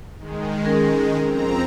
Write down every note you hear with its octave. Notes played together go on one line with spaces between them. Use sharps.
D#3 G#3
C#4 G#4 A#4
F2 C4 A#5